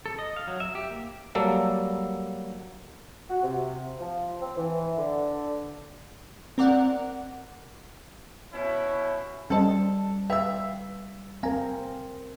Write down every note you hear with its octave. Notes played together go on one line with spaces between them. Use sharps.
A4
D#5
F5
F#3
E5
G4
A#3
F#3 G3 A#3 A4
F#4
C3
F3
C4
E3
D3
C4 A#4 D5 F#5
B2 C#4 E4
G3 C#4 A4 C5 D#5 A5
B4 E5 F5 G5 E6
C4 A#4 F5 G#5 A#5